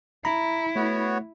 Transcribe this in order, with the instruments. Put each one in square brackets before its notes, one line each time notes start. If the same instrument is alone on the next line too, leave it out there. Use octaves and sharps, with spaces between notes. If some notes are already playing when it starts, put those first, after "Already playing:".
[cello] E4 [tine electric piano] A#5 B5
[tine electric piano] A3 [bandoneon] B3 F#4 C#5